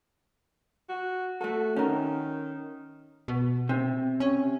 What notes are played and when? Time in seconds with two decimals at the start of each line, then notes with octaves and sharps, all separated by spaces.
0.89 F#4
1.41 A3 F#4 A4
1.76 D#3 C#4 A#4
3.28 B2
3.69 C3
4.20 C#4